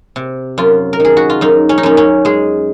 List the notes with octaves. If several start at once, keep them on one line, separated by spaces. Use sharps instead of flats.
C3
F#2 F4
A#4
D#3 G#4
F#4
F4
F#2 D#4
C#4
D#4
F#2 C#4
C#4
G#3 G#4